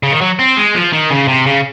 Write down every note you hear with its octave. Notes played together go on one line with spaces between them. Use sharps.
C#3
D#3
F#3
C4
G#3
F3
D#3
C#3
C3
C#3